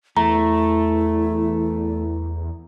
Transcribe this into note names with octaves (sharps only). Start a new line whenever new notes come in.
E2 A3 E4 A#5